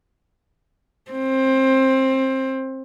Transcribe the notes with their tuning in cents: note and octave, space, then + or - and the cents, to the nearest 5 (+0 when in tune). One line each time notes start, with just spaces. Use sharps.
C4 +20